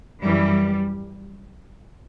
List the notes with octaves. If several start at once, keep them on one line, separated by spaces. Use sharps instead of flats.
F#2 E3 G3